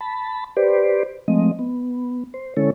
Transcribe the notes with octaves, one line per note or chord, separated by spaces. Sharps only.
A5 B5
G4 B4 C5 D5
F3 G#3 A3 C4 D#5
B3
C5
D3 G#3 C#4 E4 A4 C#5